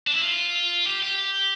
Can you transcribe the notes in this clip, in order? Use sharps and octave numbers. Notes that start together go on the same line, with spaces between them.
D4
E4
F4
G4
G4